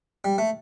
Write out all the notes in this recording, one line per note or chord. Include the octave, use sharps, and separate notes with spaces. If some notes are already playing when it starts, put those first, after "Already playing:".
G3
A3